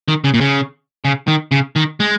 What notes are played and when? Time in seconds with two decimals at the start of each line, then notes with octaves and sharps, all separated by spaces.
0.08 D#3
0.24 C#3
0.34 A#2
0.41 C#3
1.05 C#3
1.28 D#3
1.52 C#3
1.76 D#3
2.00 G#3